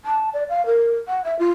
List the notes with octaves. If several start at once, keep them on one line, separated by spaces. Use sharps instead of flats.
A5
D5
F5
A#4
F#5
E5
F4